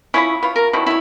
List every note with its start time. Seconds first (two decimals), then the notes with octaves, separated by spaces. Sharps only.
0.14 C#4 E4 F4 C#5 B5 D#6
0.42 B3 F4 C#5
0.56 A#4 A#5
0.73 B2 D#3 F#3 E4
0.86 E4 C#5